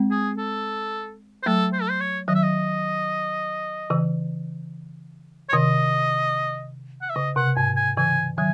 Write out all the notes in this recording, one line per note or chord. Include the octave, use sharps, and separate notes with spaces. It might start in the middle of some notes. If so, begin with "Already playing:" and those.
Already playing: G#3 C4
G#4
A4
C5
F#3 A3 A4
C5
A4
C5
C#5
D#3 F#3 D#5
E5
D#5
C#3 E3
C#5
C3 D#3 D#5
F#5
E5
C#3 D#5
C3 F#5
G#2 G#5
G#5
C#3 E3 G#5
D#3 F#3 G#5